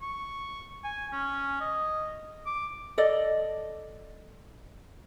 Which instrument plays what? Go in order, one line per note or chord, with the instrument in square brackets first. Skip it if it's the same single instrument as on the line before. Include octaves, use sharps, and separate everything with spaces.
[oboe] C#6
G#5
C#4
D#5
D6
[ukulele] A4 D5 D#5